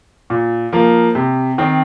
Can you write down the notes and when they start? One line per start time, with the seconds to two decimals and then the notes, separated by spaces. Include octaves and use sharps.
0.30 A#2
0.73 F3 A#3
1.15 C3
1.58 D#3 C4